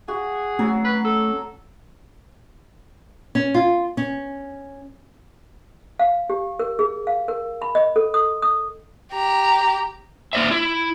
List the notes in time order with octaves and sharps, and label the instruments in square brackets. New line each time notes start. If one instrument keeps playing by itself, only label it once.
[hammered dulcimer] F#4 [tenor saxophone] G#4
[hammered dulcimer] F#3 [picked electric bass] A3 C4 C#4
[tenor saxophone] B4
A4
[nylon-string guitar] C#4
F4
C#4
[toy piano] F5
G4
A#4
G#4
F5
A#4
B5
D#5
A4
D#6
D#6
[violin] G4 A#5
[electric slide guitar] A#3 D5 E5
E4